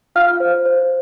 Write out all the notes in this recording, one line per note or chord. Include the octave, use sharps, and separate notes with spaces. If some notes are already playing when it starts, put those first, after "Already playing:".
F4 F5 F6
C5
C5